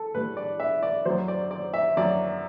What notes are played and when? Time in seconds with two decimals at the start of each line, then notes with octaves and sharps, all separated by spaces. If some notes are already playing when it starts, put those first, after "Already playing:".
Already playing: A4
0.14 A2 G3 B4
0.37 D5
0.60 E5
0.83 D5
1.05 F#2 F#3 C5
1.28 D5
1.51 D5
1.74 E5
1.97 F#2 F#3 D5